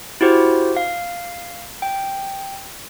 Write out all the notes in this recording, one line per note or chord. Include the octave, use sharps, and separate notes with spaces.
E4 F#4 G4 C5
F5
G5